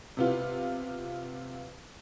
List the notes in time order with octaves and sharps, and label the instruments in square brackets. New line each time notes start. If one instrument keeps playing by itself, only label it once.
[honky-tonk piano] C3 B3 F4